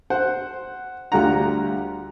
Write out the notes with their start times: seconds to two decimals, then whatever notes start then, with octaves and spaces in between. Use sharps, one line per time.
0.10 C5 F#5
1.12 D2 D3 G3 F4 F#5 A#5